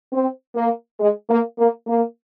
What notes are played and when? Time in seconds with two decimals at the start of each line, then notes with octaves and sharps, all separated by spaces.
0.13 C4
0.56 A#3
1.00 G#3
1.30 A#3
1.59 A#3
1.87 A#3